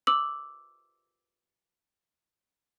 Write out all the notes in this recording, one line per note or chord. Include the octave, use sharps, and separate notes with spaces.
D6 E6 F#7